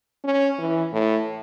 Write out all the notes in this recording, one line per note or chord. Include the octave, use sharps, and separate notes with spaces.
C#4
E3
A2